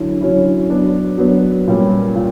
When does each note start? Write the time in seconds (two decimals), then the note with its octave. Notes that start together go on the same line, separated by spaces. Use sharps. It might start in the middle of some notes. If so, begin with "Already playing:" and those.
Already playing: D3 F#3 C#4 E4
0.20 D3 F#3 C#4 E4
0.70 F#3 B3 D4
1.18 F#3 B3 D4
1.67 A#2 G3 C#4
2.16 A#2